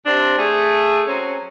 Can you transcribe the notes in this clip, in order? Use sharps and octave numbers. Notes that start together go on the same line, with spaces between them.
C3 C4 D4
A3 G#4
F#3 C4 C#4